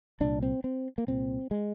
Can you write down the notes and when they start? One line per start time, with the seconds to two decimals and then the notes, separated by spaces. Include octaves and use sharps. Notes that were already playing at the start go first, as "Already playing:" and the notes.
0.20 C2 A#2 D4
0.42 C4
0.64 C4
0.98 A#3
1.07 C2 A#2 C4
1.51 G#3